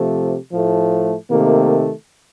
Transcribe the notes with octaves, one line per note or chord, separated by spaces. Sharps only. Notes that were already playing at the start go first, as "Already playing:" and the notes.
Already playing: C3 F3 A3
A2 F3 A3
C3 D#3 A3 A#3